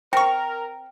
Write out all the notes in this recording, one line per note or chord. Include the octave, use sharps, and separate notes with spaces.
C4 A#4 G5 C#6